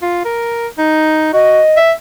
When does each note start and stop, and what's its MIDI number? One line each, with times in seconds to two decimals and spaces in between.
0.02 0.22 65
0.25 0.67 70
0.78 1.32 63
1.33 1.61 66
1.33 1.78 75
1.77 1.92 76